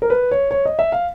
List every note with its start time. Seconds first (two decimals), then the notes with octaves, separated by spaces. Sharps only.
0.02 A#4
0.10 B4
0.31 C#5
0.51 C#5
0.65 D#5
0.79 E5
0.92 F5